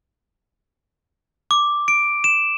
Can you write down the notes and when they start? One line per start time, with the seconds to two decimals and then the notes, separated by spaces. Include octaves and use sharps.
1.51 D6
1.88 D7
2.24 E7